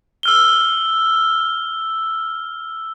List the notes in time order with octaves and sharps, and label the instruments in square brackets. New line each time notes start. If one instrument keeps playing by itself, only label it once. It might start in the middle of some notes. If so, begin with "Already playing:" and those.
[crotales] E6 F6 G7